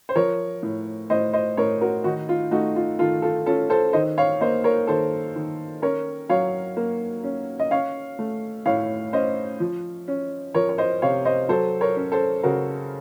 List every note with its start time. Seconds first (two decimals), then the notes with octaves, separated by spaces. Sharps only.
0.09 C5
0.16 F3 A#4 C#5
0.63 A2
1.10 A2 C5 D#5
1.33 C5 D#5
1.57 A2 A#4 C#5
1.81 F#4 A#4
2.04 D#3 D#4 F#4
2.29 F4
2.51 A3 D#4 F#4
2.76 F4
2.99 D#3 F4 A4
3.22 F4 A4
3.46 C#4 F4 A4
3.70 A4 C5
3.93 D#3 C5 D#5
4.18 C#5 F5
4.40 A#3 C5 D#5
4.64 A#4 C#5
4.87 D#3 A4 C5
5.35 D#3
5.82 C#4 A#4 C#5
6.29 F#3 C#5 F5
6.77 A#3
7.24 C#4
7.60 D#5
7.71 C#4 C#5 F5
8.19 A3
8.65 A2 C#5 F5
9.13 C#4 C5 D#5
9.60 F3
10.08 C#4
10.54 F3 A#4 C#5
10.69 C#5
10.78 C5 D#5
11.02 C3 C#5 F5
11.25 C5 D#5
11.49 F#3 A4 C5
11.81 A#4 C#5
11.96 C#4
12.12 A4 C5
12.43 C#3 F#4 A#4